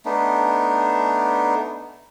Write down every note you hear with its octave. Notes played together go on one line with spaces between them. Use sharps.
A3 B3 D4 D#4